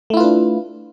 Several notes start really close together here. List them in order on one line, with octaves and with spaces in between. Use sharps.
A3 E4 F4 B4 D4